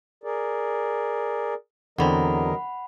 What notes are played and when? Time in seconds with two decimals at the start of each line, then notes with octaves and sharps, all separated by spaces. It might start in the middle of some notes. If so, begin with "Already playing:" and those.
0.24 G#4 A#4 D5
1.98 E2 D3 F#3 C4 A#4 D#5 F#5 B5